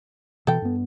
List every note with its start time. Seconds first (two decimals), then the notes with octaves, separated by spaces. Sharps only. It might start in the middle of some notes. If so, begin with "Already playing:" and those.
0.47 B2 E3 A4 G5
0.62 G2 B3